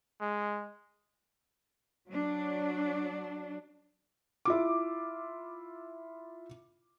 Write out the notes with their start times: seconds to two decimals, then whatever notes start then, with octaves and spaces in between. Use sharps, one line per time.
0.21 G#3
2.09 F#3 D4
4.45 E4 F4 D6